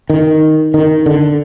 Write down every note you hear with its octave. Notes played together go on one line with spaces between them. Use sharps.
D#3
D#3
D3